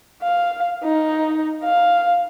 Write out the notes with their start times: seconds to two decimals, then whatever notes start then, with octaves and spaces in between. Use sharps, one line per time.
0.23 F5
0.84 D#4
1.64 F5